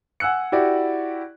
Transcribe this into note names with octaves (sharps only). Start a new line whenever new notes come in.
F#5 G#5 E6 F#6 C#7
E4 F#4 G4 D5